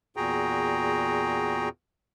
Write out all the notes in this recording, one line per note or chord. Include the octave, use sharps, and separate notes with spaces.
E2 A#2 F#4 G#4 G5 A#5